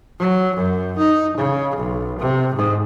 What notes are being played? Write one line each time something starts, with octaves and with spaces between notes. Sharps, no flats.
F#3
F#2
D#4
C#3
B1
C3
G#2